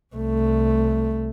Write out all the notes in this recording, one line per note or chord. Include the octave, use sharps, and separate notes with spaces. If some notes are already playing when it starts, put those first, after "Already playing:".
C2 A3